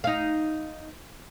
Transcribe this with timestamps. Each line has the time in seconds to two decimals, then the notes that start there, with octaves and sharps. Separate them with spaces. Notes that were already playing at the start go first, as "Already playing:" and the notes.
0.04 D#4 F5